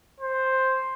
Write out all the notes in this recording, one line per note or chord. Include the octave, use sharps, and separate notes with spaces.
C5